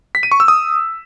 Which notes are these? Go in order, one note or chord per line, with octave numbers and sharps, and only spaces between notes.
B6
D#7
C#6
E6
D#6